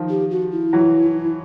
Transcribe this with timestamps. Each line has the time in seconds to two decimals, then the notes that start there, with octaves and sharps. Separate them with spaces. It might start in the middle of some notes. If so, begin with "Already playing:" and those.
Already playing: D#3 F3
0.10 G4
0.30 F#4
0.52 E4
0.73 E3 F#3